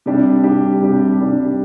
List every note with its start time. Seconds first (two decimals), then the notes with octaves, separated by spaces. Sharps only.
0.06 C3 G3 D4 G4
0.43 C3 G3 D4 G4
0.81 C3 G3 D4 G4
1.19 C3 G3 D4 G4